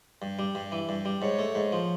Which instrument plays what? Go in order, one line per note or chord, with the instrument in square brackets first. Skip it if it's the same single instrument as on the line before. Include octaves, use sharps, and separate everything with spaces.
[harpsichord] G2
G3
G2
E3
G2
G3
[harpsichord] G#2 [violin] C#5
[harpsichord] A3
G#2
F3